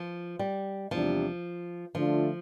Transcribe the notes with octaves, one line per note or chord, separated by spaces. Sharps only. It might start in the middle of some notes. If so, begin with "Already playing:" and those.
Already playing: F3
G3
E2 C3 F3 G3 D4
D3 F3 A3 D4 F4